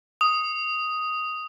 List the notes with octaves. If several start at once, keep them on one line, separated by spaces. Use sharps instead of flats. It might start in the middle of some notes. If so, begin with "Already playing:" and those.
D#6